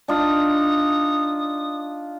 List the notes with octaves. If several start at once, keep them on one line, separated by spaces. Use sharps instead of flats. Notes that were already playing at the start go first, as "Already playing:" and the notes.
D4 D#4 F4 D#6